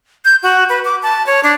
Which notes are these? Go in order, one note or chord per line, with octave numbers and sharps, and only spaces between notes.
G6
F#4
B4
D6
A5
C#5
D4